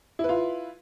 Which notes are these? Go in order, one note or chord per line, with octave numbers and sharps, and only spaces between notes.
E4 F4 B4